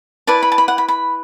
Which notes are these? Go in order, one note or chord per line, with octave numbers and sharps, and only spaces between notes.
E4 B4 D5 A5
B5
A5
B5
F#5
B5
B5